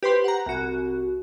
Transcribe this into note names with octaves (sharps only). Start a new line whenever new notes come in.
G4 B4 C5 C6
F#5 A#5
C2 F#4